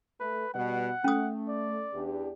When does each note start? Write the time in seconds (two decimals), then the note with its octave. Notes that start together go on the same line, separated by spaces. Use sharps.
0.20 A3 B4
0.54 B2 G3 F#5
1.04 A3 C#4 D#6
1.48 D5
1.94 E2 D4 G4